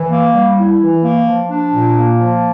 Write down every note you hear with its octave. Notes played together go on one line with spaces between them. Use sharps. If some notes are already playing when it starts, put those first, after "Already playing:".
Already playing: E3
A#3
G3
E4
E3
A#3
F3
D4
A#2
A#3
F3